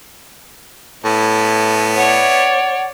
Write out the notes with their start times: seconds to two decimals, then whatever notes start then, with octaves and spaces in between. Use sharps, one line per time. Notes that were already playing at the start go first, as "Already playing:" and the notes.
1.04 A2 B3 E4
1.97 C#5 D5 F#5